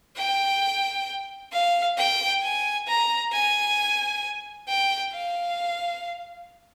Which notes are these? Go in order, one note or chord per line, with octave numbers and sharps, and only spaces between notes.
G5
F5
G5
G#5
A#5
G#5
G5
F5